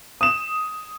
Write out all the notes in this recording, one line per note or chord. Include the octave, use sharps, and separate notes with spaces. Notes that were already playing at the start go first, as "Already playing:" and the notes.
D#6 E7